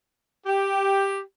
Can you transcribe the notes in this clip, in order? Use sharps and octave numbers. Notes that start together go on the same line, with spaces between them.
G4